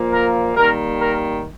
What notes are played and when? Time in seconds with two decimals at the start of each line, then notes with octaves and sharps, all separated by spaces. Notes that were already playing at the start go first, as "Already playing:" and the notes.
Already playing: A#2 F3 A#3
0.12 A#4
0.56 D#3 G3 A#3 A#4
1.00 A#4